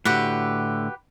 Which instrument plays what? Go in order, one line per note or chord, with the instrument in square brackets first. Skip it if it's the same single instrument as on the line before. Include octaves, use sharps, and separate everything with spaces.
[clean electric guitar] A2 D3 [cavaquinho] F#4 G4 B4